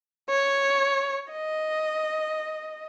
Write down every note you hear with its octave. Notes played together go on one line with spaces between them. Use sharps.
C#5
D#5